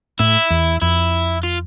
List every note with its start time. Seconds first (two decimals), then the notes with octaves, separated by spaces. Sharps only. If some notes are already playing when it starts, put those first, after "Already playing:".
0.19 A2 E4
0.50 E2
0.82 F2 E4
1.44 F4